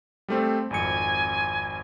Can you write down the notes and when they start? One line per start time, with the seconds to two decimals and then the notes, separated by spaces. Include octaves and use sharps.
0.28 G3 A3 C4
0.71 G#1 F2 G#5 C#7